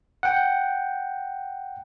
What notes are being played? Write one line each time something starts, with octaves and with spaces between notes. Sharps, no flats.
F#5 G5